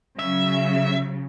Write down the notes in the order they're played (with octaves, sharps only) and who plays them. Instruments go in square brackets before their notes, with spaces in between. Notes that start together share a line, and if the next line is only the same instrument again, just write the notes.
[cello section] C#3 F#3 [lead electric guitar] E5